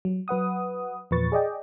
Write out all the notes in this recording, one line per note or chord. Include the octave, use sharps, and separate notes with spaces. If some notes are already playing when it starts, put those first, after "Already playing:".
F#3
F#3 B4 F#5 D#6
E2 A#2 F3 B4 C#6 A6
G#4 D5 D#5 G5